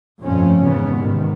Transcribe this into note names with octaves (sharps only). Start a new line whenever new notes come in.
G1 F2 A#2 A3 C4 C#4
G#1 E2 C#3 G#3 B3
G#2 C3 D#3